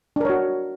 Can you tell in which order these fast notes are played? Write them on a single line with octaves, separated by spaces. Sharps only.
D4 A#4 C#5 F#4